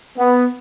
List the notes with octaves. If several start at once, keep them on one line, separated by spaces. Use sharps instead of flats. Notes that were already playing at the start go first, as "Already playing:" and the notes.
B3